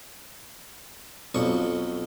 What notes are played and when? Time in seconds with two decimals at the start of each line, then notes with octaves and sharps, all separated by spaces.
1.35 B1 F2 C#6